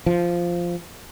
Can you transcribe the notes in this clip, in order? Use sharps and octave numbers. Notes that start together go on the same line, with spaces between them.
F3